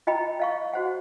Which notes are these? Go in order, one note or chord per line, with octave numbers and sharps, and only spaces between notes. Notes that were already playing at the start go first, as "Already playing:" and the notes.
F4 D#5 G5 A#5 B5
D#5 F5 C#6
F#4 C5 F#5